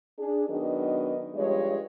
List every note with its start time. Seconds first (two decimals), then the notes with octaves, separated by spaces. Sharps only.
0.17 D4 G#4
0.48 D#3 F#3 B3 D4 A#4 D#5
1.34 G2 F3 G3 G#3 C#5 D#5